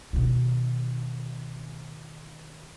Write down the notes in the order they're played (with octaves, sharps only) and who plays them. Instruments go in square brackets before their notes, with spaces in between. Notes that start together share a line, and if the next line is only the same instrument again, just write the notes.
[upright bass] B2 D#3